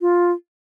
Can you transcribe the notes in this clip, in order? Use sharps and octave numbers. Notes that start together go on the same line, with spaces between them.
F4